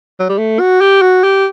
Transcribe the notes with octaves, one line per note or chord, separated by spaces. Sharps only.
F#3
G3
A3
F#4
G4
F#4
G4